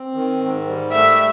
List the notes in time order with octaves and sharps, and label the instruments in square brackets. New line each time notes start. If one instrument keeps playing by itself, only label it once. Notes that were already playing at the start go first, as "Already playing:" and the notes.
Already playing: [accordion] C4
D#3
G#2
G3
[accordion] A3 [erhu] E5